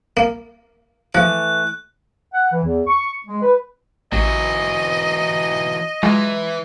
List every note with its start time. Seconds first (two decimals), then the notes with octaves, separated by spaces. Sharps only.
0.17 A#3
1.15 E3 F3 A3 F#6
2.33 F#5
2.52 E3
2.63 E2
2.87 C#6
3.27 G#3
3.42 B4
4.12 A1 E3 F#3 D#5
6.03 E3 F#3 G#3 F4